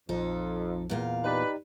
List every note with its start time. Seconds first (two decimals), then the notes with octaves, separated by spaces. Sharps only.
0.09 A#1 F2 F3 D#4 A4
0.89 E2 A#2 F5
1.24 D#4 G4 B4 D5